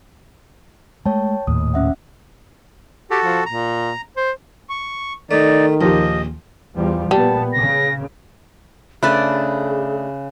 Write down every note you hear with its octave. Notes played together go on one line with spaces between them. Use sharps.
G#3 A3 C#5 G5 A5
D#1 D#2 A2 D#6
C#4 E5 F#5
F#4 G4 A4
F3
A#2 A#5
C5
C#6
D#3 A3 D#4 D5
A#1 D#2 F3 G4 D#5
E2 F3 G3
A#2 G3 B3 A5
C#3 A#6
C#3 A3 D4 G#4 B4 D5 B5 F#6